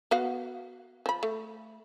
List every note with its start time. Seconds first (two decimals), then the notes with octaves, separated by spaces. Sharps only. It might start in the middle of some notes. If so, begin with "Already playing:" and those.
0.11 B3 F#4 F5
1.06 F3 B5
1.23 A3